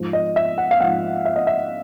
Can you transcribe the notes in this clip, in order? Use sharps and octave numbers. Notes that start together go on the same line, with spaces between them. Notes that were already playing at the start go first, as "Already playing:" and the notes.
Already playing: G#2 F3
D#5
E5
F#5
F5
G#2 F3 F#5
E5
D#5
E5